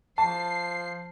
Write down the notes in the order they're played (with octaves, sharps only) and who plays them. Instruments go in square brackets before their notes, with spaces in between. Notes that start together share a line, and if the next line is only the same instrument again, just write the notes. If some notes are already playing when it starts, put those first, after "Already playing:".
[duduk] F3 [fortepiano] A5 [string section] C7